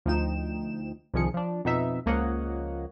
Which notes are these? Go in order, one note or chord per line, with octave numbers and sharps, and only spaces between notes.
D2 F3 D#4 G5 E7
C2 C3 D#3 F3 G#4 C#7
F3 D4
F2 B2 B3 D#4 E5
C#2 F3 A#3 C#5 D#5 F#5